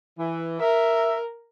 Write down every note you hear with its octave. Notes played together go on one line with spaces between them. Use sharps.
E3
A#4 E5